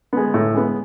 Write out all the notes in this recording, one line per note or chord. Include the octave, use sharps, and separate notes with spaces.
G#3 B3
A2
G#3 B3